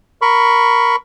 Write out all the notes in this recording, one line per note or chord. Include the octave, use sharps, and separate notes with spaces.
A#4 B5 C#6